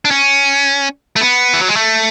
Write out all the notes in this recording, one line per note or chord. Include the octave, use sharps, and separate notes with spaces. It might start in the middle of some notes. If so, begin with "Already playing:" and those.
D4
C#4
A3
B3
E3
F#3
G#3
A3